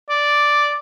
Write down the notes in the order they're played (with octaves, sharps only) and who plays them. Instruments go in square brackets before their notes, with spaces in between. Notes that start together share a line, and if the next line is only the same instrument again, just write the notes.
[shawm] D5